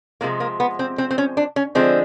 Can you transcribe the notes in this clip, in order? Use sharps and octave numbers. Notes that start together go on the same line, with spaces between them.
C3 F3 G#3 A#3
A#3
B3
C4
C4
C4
C#4
D4
C#4
D3 F3 G#3 C4